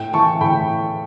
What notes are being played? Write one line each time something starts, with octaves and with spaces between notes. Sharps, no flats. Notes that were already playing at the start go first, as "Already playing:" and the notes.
Already playing: A2 G5
E3 A5 C#6
A2 G5 B5